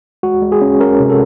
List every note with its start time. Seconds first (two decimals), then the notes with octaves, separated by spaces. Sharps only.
0.23 G#3 F#4
0.42 G#3
0.52 G#4
0.61 C#4
0.80 C#4 A#4
1.00 C3
1.10 A4